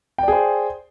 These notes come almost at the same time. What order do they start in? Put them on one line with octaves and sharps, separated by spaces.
G5 D5 G#4 C5